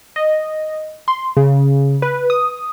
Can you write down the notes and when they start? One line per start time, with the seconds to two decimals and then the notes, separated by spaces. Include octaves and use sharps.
0.16 D#5
1.08 C6
1.37 C#3
2.02 B4
2.30 D#6